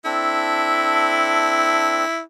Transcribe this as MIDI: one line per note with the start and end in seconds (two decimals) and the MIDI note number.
0.05 2.05 60
0.05 2.05 62
0.05 2.20 64
0.05 2.05 69